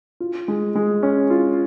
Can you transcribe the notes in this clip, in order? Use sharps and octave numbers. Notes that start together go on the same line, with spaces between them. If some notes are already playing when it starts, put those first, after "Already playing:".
F4
G#3
G#3
C#4
F4